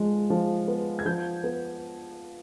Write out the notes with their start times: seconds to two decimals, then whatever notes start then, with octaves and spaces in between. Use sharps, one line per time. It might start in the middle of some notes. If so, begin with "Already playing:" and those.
Already playing: F3 G#3
0.30 F3
0.68 B3
0.99 G#6
1.06 F3 G6
1.44 B3